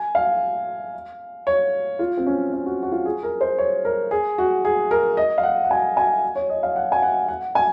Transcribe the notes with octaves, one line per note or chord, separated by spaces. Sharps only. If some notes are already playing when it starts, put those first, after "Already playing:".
Already playing: G#5
F5
C#5
F4
C4
C#4
C#4
F#4
F#4
F4
G#4
A#4
C5
C#5
A#4
G#4
F#4
G#4
A#4
D#5
F5
F#5
F#5
G#5
G#5
C#5
D#5
F5
F#5
G#5
F#5
F#5
G#5